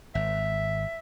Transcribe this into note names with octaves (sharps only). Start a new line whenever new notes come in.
G#1 E5